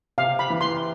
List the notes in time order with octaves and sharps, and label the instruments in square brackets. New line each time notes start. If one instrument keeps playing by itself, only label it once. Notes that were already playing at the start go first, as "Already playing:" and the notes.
[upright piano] C3 [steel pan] F5
[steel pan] B5
[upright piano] E3
[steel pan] C6